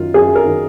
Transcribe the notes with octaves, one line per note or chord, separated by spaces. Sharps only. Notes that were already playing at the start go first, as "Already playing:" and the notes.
Already playing: F#2 D#3 F4
F#2 G#4
A#4
D#3